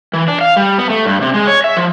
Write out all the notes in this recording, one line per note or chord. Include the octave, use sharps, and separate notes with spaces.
E3
D4
F5
G3
B3
A3
G2
C3
G#3
C#5
E5
F3